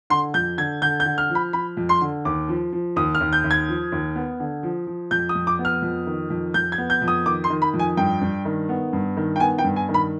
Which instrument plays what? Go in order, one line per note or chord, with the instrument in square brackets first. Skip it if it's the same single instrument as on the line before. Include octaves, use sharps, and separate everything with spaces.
[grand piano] D3 C6
F2 G6
D3 G#6
D3 G6
G6
D3
F6
F3
B5
F3 B5
F2
C6
D3
D#2 D6
F3
F3
D#2 D#6
F6
D#2
G6
D#2
G#6
F3
D#2
B3
D3
F3
F3
F2 G6
D#6
F2
D6
B3
F6
F2
D#3
F2
F2 G6
G#6
B3
G6
F2
D#6
D#3 D6
C6
D#3
B5
F2
G#5
G2 G5
G2
D#3
B3
G2
D#3
G5
B3 G#5
G5
G2
G#5
D#3
B5